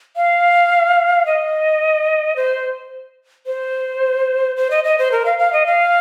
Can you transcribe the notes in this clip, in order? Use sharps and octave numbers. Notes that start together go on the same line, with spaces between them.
F5
D#5
C5
C5
C5
D#5
D#5
C5
A#4
F5
F5
D#5
F5